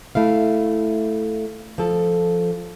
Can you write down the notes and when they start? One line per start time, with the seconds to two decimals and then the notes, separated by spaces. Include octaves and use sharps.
0.15 A3 E4 F5
1.78 F3 A4